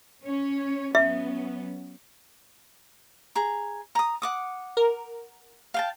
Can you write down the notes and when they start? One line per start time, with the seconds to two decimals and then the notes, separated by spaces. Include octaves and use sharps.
0.23 C#4 C#5
0.95 F#3 B3 C#4 E5
3.35 G#4 A#5
3.95 A#5 D#6
4.22 F#5 D6 D#6
4.77 A#4
5.74 F5 G5 A5